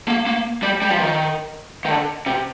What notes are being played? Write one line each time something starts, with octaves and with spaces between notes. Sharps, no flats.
A#3
A#3
G3
G3
F3
D#3
D#3
D3
C3